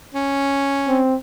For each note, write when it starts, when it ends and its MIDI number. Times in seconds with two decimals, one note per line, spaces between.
0.15 1.01 61
0.88 1.15 60